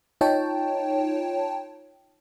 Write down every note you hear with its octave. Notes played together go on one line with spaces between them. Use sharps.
D#4 F4 C#5 G5 A5